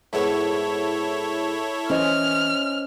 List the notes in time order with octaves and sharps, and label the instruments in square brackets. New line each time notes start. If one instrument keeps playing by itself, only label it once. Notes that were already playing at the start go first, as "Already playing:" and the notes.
[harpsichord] G#2 B3 [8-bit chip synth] E4 A4 C#5
[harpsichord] E3 [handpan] C#4 C5 D#5 [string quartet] F6